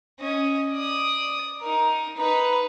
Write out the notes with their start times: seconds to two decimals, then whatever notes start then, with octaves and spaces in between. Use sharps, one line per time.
0.19 C#4 D#5
0.72 D5 D#6
1.61 D#4 A#4
2.17 D#4 B4